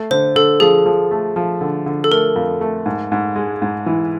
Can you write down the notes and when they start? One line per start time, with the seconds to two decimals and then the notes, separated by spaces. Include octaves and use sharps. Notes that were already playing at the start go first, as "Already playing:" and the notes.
Already playing: A3
0.11 D3 C5
0.35 D3 A4
0.60 F3 G#4
0.86 F3
1.11 A3
1.36 F3
1.61 D3
1.86 D3
2.04 A4
2.11 A3 A#4
2.36 F2
2.61 A3
2.86 G#2
3.12 G#2
3.36 G#3
3.62 G#2
3.86 E3